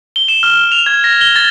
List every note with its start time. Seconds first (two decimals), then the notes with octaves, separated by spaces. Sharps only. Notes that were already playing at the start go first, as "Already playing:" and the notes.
0.16 G7
0.28 E7
0.43 F6
0.72 F7
0.86 G#6
1.04 A#6
1.21 G7
1.36 A6